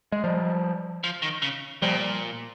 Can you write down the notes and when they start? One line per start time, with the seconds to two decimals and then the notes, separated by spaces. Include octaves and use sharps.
0.12 G#3
0.24 F3 G3
1.04 F3
1.22 D#3
1.42 C#3
1.82 A#2 F3 G3